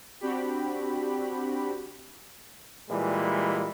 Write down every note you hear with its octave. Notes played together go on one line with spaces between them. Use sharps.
C4 D4 F#4 G4 B5
A#2 E3 G3 G#3